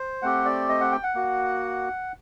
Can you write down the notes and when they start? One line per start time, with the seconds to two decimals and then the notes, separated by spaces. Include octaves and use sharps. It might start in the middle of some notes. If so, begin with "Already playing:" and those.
Already playing: C5
0.22 A3 C4 G4 F#5
0.45 D5
0.69 D#5
0.80 F#5
0.92 G5
1.03 F#5
1.15 A#3 F#4